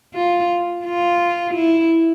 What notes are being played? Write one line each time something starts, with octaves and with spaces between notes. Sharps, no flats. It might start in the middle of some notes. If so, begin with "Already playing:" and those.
F4
F4
E4